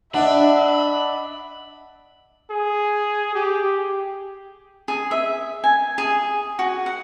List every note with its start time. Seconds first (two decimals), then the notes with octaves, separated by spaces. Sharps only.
0.14 D4 D#5 E5 F#5 B5
2.51 G#4
3.35 G4
4.88 G#4
5.11 E5
5.64 G#5
5.98 G#4
6.59 F#4
6.86 F#5